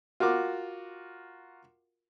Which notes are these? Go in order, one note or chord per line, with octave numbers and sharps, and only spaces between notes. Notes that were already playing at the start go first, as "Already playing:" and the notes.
F4 F#4 A#4 D6